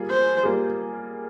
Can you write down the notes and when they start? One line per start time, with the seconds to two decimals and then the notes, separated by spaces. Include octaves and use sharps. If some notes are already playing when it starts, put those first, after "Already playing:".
Already playing: G3 A#3 F4 G#4
0.10 C5
0.43 G3 A#3 F4 G#4